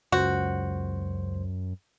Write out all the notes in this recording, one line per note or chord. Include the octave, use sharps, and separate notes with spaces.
C#2 F#2 F#4 C5